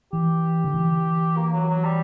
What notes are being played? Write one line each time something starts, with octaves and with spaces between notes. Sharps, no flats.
E3 G4
D3
E3
A#3
F#3
F#3
G3